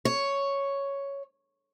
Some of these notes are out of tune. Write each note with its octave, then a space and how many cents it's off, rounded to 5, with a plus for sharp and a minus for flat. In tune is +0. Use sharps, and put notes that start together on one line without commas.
C#5 +5